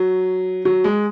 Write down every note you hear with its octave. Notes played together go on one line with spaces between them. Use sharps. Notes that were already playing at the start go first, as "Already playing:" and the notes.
Already playing: F#3
F#3
G#3